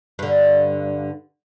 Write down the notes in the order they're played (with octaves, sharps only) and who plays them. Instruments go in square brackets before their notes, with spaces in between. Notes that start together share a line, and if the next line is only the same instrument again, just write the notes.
[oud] G2 D3